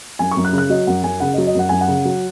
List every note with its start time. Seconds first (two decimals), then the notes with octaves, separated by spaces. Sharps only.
0.19 F#2 G#5
0.31 C#6
0.37 F#2
0.45 F#6
0.53 C#3
0.58 F#6
0.70 F#3 D#5
0.87 F#2 F#5
1.03 F#2 G#5
1.20 C#3 F#5
1.34 D#5
1.38 F#3
1.47 D#5
1.55 F#2 F#5
1.69 F#2 G#5
1.81 F#5
1.88 C#3
2.05 F#3